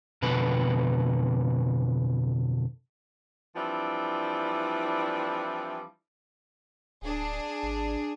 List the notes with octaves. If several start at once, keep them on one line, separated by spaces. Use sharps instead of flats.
F2 B2 D3 B4
E3 F3 G3 C4 D4 E4
D1 D4 G#4
G#1